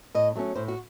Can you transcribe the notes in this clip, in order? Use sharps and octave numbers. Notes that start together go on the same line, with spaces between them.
A2 D#5
F#3 A3 C#4
A2 C5
F#4